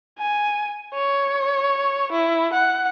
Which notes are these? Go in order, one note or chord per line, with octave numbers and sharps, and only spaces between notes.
G#5
C#5
E4
F#5